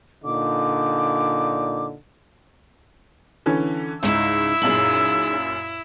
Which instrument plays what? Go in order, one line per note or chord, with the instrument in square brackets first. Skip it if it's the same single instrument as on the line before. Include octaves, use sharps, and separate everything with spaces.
[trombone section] A#2 D3 D#4 [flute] D6
[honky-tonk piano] D3 E3 C#4
[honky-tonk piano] C#2 [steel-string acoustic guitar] G#2 C#3 D#4 [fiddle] E4 [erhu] E6
[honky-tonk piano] F#2 A#2 F#7 [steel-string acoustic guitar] D#4 G#4